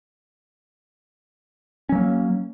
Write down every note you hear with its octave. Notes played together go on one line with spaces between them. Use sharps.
F#3 A#3 C#4